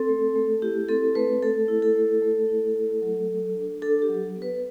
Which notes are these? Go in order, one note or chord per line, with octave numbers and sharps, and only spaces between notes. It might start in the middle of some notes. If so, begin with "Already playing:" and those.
Already playing: C4 A4
A3
A3
E4 G4
C4 A4
A3 B4
A3 A4
E4
A4
A3
A3
E4
A3
F#3
F#3
D4
D4 A4
G4
F#3
B3
B4